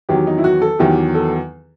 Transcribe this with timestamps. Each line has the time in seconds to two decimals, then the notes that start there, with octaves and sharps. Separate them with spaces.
0.09 E2 D#3 F#3 G4
0.27 D#4
0.38 E4
0.44 F#4
0.62 A4
0.79 E2 D#3 F#3 G4
1.15 A4